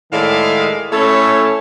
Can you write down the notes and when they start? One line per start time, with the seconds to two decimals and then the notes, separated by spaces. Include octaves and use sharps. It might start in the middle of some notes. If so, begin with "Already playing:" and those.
0.12 A2 D#3 G#3 D5 E5 F5
0.93 A3 C#4 E4 A4 C#5